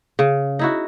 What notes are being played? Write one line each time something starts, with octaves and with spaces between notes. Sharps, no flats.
C#3
D#4 E4 F#4